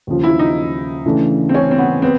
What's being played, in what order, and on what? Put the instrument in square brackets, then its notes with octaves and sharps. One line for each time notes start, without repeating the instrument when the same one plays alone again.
[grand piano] D#2 C#3 F3
[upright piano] E4
D#4
[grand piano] C#3 E3 A3 D4
[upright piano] C4
C#4
C4
B3
[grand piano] B3 [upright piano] C4